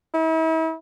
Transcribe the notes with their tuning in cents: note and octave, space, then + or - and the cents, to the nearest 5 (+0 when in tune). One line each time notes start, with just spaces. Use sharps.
E4 -40